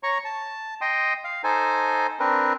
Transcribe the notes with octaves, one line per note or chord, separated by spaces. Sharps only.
C#5 A#5 C#6
A5
D#5 G5 C6 D#6
F5
D#4 A4 C5 G#5
C4 D4 A#4 B4